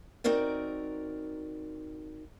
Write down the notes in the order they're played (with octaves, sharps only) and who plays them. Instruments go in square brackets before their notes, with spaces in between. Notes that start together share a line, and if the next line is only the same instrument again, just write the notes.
[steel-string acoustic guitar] C4 D#4 F#4 A#4 D5